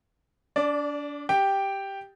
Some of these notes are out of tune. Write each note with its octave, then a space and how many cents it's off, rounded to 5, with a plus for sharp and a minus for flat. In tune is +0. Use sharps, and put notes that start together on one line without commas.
D4 -30 D5 +0
G4 +0 G5 +0